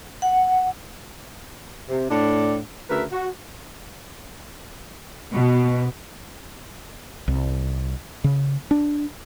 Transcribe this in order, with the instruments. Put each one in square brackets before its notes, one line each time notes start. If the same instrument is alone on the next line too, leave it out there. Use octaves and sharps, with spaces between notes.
[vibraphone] F#5
[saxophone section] C3
A2 D4
D2 C#3 A#4 B4 E5
F#4
[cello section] B2
[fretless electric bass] C2
C#3
D4